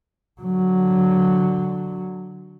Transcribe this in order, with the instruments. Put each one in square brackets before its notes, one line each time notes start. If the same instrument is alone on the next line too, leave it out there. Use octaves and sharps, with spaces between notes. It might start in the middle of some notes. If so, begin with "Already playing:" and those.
[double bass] D3 F#3